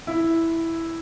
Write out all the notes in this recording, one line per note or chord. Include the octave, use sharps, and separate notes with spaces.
E4